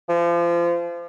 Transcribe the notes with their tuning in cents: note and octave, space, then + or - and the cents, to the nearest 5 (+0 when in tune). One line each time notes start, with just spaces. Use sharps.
F3 -30